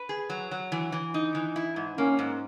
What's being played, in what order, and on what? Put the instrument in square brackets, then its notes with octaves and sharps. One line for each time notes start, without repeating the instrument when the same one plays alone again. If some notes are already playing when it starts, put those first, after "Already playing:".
Already playing: [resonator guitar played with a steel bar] B4
G#4
F#3
F#3
E3
E3
D#4
E3
E4
G#2
[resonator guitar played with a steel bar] A#3 [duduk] C#4
[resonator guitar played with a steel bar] G#2